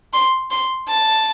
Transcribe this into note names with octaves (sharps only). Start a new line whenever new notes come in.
C6
C6
A5